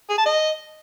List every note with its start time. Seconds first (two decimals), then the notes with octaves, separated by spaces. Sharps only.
0.10 G#4
0.18 A5
0.26 D#5